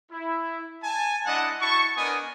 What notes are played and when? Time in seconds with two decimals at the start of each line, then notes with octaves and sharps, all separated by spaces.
0.11 E4
0.83 G#5 A5
1.26 G#3 D4 E4 D#5 F#5 A5
1.61 E4 F#4 A5 C#6
1.97 B3 D4 A#4 D#5 G#5 D#6